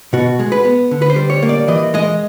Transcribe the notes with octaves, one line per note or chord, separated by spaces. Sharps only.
B2 F#4
G#3
B4
B3
D3
B4
C5
G3
C#5
A#3
D5
E3 D#5
G#3 D#5